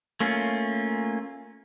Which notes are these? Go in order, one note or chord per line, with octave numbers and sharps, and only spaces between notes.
A3 A#3 C#4 F4